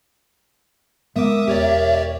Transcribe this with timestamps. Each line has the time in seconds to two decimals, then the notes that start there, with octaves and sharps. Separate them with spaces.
1.16 G#3 B3 A#4 E5 D6 D#6
1.48 E1 G4 C#5 D5